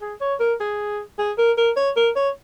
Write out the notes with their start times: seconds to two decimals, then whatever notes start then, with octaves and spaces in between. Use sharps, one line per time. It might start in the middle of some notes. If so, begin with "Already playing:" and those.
0.01 G#4
0.21 C#5
0.40 A#4
0.60 G#4
1.19 G#4
1.38 A#4
1.58 A#4
1.76 C#5
1.97 A#4
2.16 C#5